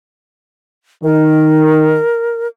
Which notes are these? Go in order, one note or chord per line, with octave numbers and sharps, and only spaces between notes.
D#3 A#4